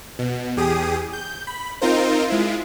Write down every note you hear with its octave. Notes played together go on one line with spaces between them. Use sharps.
B2
E2 G4 G#4 D#6
G6
B5
C4 D#4 F4 A#4 C5
G#3 E4 F4